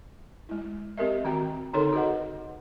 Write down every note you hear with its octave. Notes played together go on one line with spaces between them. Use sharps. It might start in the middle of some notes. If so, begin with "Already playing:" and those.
G#3 E4
C4 G4 A#4 D#5 E5
D#3 C4 F#4 G5 A#5
D3 D#4 A4 A#4 C#5 C6
F#4 G#4 B4 D#5 F#5